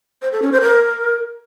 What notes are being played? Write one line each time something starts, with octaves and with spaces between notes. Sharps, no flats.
C5
A4
C#4
C5
A#4